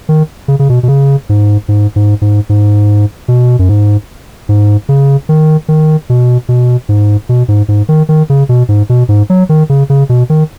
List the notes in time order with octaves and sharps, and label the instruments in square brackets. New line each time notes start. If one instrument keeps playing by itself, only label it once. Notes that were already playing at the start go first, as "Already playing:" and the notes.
[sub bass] D#3
C#3
C#3
B2
B2
C#3
G#2
G#2
G#2
G#2
G#2
B2
F#2
G#2
G#2
C#3
D#3
D#3
B2
B2
G#2
B2
G#2
G#2
D#3
D#3
C#3
B2
G#2
B2
G#2
F#3
D#3
C#3
C#3
B2
D#3